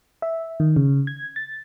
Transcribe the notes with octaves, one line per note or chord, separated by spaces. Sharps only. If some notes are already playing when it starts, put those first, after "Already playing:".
E5
D#3
C#3
G#6
A6